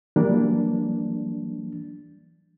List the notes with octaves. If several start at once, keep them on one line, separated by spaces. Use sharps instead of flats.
E3 F#3 G3 A#3 D4